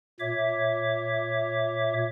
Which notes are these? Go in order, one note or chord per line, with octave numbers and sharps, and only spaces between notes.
A#2 C#5 E5 D6